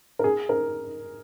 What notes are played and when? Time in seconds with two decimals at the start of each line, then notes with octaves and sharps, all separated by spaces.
0.19 A#4
0.24 G#4
0.49 A#4